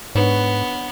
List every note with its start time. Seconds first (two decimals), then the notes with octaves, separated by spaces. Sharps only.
0.15 G#2 B3 D4 B4 C#5